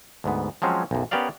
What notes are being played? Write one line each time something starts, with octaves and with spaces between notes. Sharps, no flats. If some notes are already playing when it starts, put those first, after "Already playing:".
D2 G#2 B3
F3 F#3 G#3 C4 C#4
B1 F#2
B3 C#4 G4 A#4 D5 F5